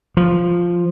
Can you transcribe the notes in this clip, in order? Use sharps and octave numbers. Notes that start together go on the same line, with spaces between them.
F3